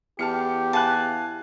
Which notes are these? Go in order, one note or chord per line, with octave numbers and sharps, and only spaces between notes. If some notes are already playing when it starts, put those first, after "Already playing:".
E2 G4 A5 F6 C#7
F5 G#5 A5 F#6